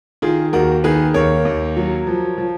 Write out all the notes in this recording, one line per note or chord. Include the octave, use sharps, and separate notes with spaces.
D#3 F4 G#4
D#2 F#4 A#4
D#3 G#4 B4
D#2 A#4 C#5
D#2
F#3
F3
F3